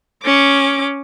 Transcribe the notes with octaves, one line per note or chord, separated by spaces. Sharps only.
C#4 D6